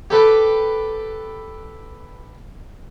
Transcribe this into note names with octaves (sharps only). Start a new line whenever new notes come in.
G4 A4 B4